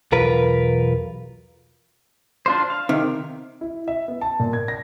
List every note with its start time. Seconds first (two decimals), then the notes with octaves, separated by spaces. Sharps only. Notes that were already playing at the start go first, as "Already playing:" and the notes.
0.12 B1 E2 F4 A#4 B4
2.46 D4 F4 C5
2.70 F5
2.89 C3 D#3
3.61 E4
3.88 E5
4.08 B3
4.21 A5
4.40 A#2
4.53 G#6
4.68 A#6